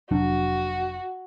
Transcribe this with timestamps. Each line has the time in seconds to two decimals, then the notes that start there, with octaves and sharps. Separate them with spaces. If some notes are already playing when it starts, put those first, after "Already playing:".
0.11 F1 F#3 D4 F#4